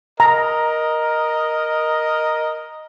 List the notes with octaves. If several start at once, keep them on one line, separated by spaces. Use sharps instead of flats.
A#4 D#5 A#5